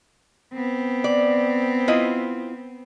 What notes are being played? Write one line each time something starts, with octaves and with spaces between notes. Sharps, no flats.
B3 C4
D5
E4 F4 D#5